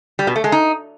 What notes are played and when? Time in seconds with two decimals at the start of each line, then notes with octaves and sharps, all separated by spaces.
0.19 G3
0.27 B2
0.36 A3
0.44 G#3
0.52 D#4